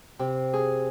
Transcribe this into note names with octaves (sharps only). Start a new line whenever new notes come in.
C3
G#4